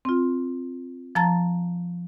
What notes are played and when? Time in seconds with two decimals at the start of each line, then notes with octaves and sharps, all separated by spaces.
0.05 C4 F4
1.15 F3 A5 A#5 A6